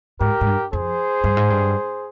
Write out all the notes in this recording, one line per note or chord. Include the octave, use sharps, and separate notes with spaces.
G#2 G4 A#4
G#2
G2
F2 G#4 C5
G2
G#2
G2